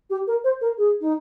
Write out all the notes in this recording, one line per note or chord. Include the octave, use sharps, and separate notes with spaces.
G4
A#4
C5
A#4
G#4
D#4